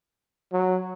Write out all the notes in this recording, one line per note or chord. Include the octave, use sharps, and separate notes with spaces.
F#3